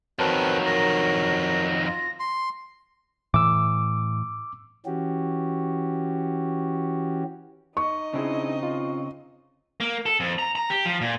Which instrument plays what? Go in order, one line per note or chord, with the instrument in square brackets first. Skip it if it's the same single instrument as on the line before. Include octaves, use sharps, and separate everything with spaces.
[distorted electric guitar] F2 D#3 [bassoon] F#3 [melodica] C4 A#4 B4 [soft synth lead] A5
[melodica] A#4 [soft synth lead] A#6
[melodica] F4
C6
[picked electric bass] A2 E3 [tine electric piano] D6 E6
[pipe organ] E3 C#4 F#4 G4
[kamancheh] D#4 D#5 [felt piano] C#6
[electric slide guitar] C#3 C4 [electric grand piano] D4 E4 G#4
[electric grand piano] F4
[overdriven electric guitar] A#3
A4
F2
A#5
A#5
G4
F3
A#2